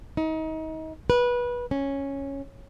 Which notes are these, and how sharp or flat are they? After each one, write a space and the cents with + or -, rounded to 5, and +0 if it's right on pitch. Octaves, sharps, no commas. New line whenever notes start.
D#4 +30
B4 -20
C#4 -5